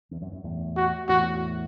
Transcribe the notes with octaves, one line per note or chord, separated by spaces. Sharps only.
E2
F#2
F#2
E2 A2
F#4
E2 A2 F#4